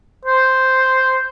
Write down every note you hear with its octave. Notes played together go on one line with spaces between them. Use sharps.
C5